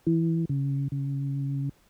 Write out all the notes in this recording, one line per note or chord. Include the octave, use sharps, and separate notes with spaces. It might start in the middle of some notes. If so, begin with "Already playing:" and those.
E3
C#3
C#3